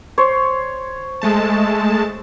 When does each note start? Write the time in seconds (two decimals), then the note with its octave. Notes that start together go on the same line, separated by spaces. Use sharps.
0.18 C5 C#5
1.22 G#3 A3 A5